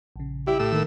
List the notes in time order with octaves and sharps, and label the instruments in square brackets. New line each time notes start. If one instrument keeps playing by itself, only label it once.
[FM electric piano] A#1 C#3
[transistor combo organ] E4 [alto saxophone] G4
[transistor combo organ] A2 E6
[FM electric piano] D#3 A#3 A#4